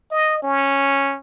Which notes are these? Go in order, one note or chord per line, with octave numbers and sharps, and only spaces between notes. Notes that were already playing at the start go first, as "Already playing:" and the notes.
D#5
C#4